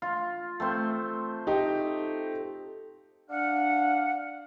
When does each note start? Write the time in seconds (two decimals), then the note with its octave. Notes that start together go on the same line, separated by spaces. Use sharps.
0.02 F4
0.60 A3 C4 C5
1.47 D#4 G4
3.30 D4 F5 F#5